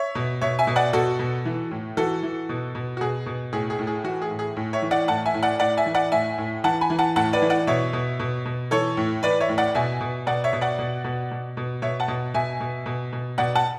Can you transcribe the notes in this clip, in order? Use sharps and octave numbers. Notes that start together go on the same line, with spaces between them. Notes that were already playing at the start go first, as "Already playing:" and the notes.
Already playing: C#5 E5
B2
B2 C#5 E5
E5 G#5
B2
D5 F#5
B2 F#4 A4
B2
E3
A2
E3 F#4 A4
E3
B2
B2
F#4
B2 G#4
B2
A2 G#4
G#4
A2
G#4
E3 F#4
G#4
A2
G#4
A2
C#5 E5
E3
D5 F#5
A2 F#5 A5
E5 G#5
A2
D5 F#5
A2 D5 F#5
E5 G#5
E3
D5 F#5
A2 E5 G#5
A2
E3 F#5 A5
G#5 B5
E3
F#5 A5
A2 F#5 A5
B4 D5
E3
D5 F#5
B2 C#5 E5
B2
B2
B2
E3 A4 C#5
A2
E3 B4 D5
C#5 E5
A2
D5 F#5
B2 E5 G#5
B2
B2 D5 F#5
C#5 E5
B2
D5 F#5
B2
B2
B2
B2
B2 C#5 E5
F#5 A5
B2
B2 E5 G#5
B2
B2
B2
B2 D5 F#5
F#5 A5